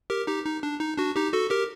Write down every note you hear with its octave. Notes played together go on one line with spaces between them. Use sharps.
G4 A#4
D#4 G4
D#4
D4
D#4
D4 F#4
D#4 G4
F#4 A4
G4 A#4